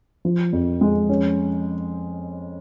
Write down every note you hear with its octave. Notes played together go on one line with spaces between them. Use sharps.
F3
F2
G#3
C#4